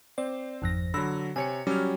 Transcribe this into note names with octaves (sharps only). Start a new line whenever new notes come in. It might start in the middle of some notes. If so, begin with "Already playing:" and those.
C4 C5 D5
G#1 F2 A#6
D3 F#3 B5 E6 A#6
C3 C#5 G#5 C#7
F#3 G3 C#4 D6 F6